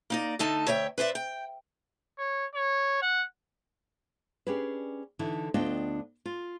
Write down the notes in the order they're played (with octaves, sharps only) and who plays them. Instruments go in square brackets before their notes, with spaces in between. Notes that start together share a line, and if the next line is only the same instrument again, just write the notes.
[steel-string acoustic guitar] A#3 D#4 D5
D3 A3 D#4 A5
D2 C#5 E5 G5
B4 C5 D5 E5
G5
[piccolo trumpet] C#5
C#5
F#5
[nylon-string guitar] C#4 D4 G4 G#4 B4
D3 E3 D#4 E4
D2 B3 D4 F4 D#5 G5
F4